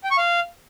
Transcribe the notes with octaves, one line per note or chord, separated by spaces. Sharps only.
G5
C#6
F5